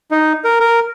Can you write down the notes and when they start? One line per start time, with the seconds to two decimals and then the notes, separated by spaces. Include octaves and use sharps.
0.11 D#4
0.44 A#4
0.60 A#4